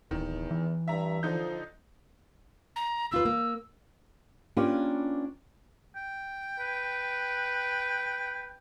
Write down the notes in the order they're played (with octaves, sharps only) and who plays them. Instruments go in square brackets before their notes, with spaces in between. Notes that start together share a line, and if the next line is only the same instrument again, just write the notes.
[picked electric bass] D1 [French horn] E2 [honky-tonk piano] D#3
[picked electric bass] E3
[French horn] G2 [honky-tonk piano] E5 A#5
[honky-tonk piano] D3 D#4 G6 [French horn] F3
[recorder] A#5
[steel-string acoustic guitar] D#2 F4 B4 [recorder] E6
[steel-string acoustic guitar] A#3
[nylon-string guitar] A#3 C#4 D4 F4 G4 B4
[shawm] G5
[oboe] B4